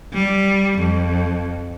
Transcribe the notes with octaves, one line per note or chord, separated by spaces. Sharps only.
G3
F2